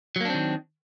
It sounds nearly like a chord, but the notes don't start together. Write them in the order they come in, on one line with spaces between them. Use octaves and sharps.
F#3 A#3 D4 C4 D#3